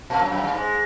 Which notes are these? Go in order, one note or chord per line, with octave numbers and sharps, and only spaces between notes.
A#2 A#3
F#2 F#3
F#2 F#3
G2 G3
G#2 G#3